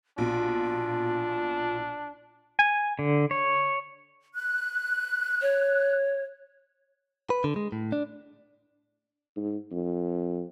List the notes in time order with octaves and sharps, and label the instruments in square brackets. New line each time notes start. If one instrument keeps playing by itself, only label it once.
[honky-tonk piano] A#1 B2 [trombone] D4 [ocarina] F4
[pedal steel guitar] G#5
D3
C#5
[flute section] F#6
[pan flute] C#5
[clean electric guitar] B4
D3
G#3
A2
D4
[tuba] G#2
F2